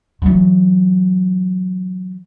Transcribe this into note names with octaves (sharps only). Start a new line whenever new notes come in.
E3 F#3